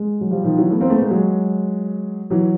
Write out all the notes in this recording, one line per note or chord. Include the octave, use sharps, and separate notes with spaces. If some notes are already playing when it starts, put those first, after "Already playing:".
Already playing: G#3
F#3
F3 G3
D#3 F3
E3 F#3
A3 B3
A#3 C4
A3 B3
G#3 A#3
F#3 G#3
E3 F#3